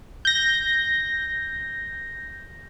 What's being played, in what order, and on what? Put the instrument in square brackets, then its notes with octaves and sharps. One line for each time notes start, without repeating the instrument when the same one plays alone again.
[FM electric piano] G6 A#6